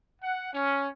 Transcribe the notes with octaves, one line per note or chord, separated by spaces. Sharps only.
F#5
C#4